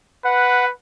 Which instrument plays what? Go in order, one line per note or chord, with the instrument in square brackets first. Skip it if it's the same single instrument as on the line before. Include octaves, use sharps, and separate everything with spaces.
[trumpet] B4 [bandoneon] F#5